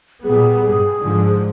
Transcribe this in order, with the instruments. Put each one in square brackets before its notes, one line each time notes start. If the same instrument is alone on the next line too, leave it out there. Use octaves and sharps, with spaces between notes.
[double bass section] A#2 G3 B3 [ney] G#4
[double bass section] G2 [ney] G#4
[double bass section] G#2 D3 F3